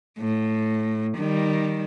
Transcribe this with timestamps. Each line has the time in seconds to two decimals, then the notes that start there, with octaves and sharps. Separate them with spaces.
0.19 A2
1.18 D#3 G3